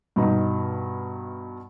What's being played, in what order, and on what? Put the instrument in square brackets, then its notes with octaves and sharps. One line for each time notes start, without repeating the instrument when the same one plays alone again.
[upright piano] G2 B2 D#4